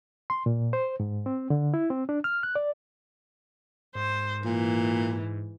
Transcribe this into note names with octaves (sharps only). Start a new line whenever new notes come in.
C6
A#2
C5
G#2
C4
D3
E4
C4
D4
F6
F#6
D5
G#2 C5
A#2 E3